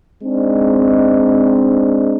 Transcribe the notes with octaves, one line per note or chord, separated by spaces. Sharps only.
G#3 C4 D4 D#4